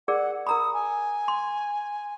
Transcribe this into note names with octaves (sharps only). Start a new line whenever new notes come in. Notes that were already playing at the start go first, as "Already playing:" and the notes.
G#4 A#4 D5 F#5
A#4 A#5 B5 D#6
G#5
C6